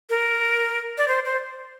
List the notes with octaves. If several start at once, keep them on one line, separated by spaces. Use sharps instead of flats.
A#4
D5
C5
C5